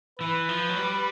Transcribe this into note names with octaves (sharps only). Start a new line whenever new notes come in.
E3 B4
F3
F#3
G3